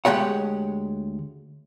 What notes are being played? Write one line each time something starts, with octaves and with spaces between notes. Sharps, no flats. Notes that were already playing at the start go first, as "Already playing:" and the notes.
D2 G#3 G4 C#5 F#5